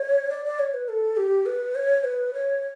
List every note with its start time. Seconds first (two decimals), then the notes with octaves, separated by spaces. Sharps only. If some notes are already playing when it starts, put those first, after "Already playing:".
Already playing: C#5
0.30 D5
0.45 D5
0.59 C#5
0.74 B4
0.89 A4
1.17 G4
1.46 B4
1.75 C#5
2.04 B4
2.34 C#5